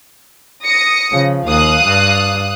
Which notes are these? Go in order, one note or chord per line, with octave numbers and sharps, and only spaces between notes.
D#6 A#6 C#7
C#3 F3
D#2 F5 D#6 F#6
G2